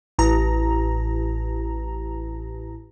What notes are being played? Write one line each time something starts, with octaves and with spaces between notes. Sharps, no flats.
A1 A#5